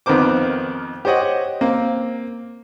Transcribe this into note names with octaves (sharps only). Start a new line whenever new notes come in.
F2 D#3 B3 A#4 C5 D6
G4 C5 C#5 D#5 F#5
A#3 C4